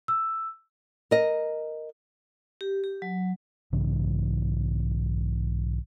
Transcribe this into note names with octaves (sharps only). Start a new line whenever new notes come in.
E6
A#4 D#5
G4
G4
F#3
B1 G#2 C#3 E3